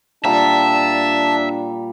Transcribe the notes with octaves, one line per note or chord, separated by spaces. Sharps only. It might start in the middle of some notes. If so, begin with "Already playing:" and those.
A#2 G3 D4 E5 A5 A#5